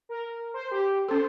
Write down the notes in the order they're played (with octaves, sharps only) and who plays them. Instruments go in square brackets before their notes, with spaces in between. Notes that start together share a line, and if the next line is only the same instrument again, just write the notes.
[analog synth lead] A#4
C5
G4
[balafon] C#4 A4 [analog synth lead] C5